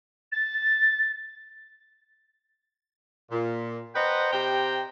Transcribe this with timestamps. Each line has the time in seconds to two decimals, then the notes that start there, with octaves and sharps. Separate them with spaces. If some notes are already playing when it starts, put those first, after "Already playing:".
0.32 A6
3.31 A#2
3.95 B4 C5 D#5 F#5 G5 A#5
4.33 C3 G4 C5 G5 A#5